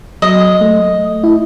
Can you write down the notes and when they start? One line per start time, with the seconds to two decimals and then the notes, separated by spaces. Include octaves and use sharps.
0.22 F#3 D#5
0.61 A3
1.24 E4